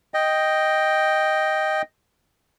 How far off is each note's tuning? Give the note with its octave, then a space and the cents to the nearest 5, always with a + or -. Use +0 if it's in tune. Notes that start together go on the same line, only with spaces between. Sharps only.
D#5 +0 G5 +0